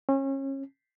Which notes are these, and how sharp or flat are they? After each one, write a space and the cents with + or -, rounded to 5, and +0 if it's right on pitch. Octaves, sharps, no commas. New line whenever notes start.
C#4 -30